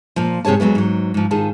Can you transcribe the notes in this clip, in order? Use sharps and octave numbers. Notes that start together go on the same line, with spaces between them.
A#2 F3
G#2 C3 G#4 C#5 A5
F2 F#3 G#3 B3
G#2 F#3
G#2 F3
G#2 D#3 F4 G#4 A5